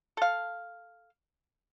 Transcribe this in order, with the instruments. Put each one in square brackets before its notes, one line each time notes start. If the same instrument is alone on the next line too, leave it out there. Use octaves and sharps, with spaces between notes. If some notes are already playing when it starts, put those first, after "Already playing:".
[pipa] A4 F5